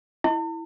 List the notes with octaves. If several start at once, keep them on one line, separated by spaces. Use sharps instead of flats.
E4